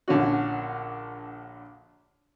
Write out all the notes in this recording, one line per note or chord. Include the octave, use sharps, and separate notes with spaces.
A#1 D3 C#4 F#4